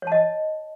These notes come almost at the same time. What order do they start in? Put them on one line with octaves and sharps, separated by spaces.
C#5 A5 D#5